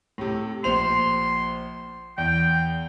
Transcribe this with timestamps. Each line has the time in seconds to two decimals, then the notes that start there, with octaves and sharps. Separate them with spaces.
0.18 A2 C3
0.64 A#1 C5 C6 F7
2.18 E2 G5